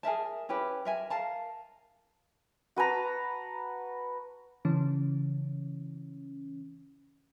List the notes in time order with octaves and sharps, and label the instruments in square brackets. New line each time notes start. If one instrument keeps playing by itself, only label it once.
[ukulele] G#4 A#4 E5 A5
C#4 E4 G4 B4
A#4 E5 G#5
A#4 F5 A5 A#5
[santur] F#4 B4 A5 A#5
[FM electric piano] C#3 E3 C#4